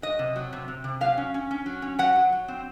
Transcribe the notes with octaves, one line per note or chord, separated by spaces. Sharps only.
F#3 D#5
C3
F#3
C3
C3
C3
F#3 F5
C#4
C#4
C#4
F#3
C#4
F#3 F#5
F#3
F#3
C4